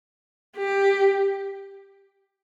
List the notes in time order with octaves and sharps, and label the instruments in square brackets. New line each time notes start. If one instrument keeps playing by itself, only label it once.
[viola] G4